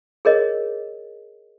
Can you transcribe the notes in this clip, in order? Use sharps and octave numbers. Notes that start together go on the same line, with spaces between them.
G#4 A#4 C#5 D#5